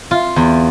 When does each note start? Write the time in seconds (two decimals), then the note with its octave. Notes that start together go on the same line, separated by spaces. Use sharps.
0.11 F4
0.36 E2